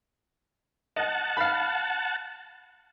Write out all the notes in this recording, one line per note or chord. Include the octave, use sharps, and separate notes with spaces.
D#5 F#5 A5
F5 B5